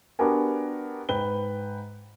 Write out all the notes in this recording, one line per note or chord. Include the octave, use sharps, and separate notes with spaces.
B3 D4 F#4 G4 A#4 G#5
G#2 B4 G5 G7